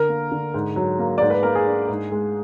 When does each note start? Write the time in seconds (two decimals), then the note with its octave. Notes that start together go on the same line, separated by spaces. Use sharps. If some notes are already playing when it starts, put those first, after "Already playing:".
Already playing: D3 A#4
0.09 A#3
0.32 D3
0.54 G#2
0.76 F#3
0.99 A#3
1.18 G#2 D5
1.30 B4
1.43 A#3 A#4
1.55 G#4
1.67 D4
1.89 G#2
2.12 G#3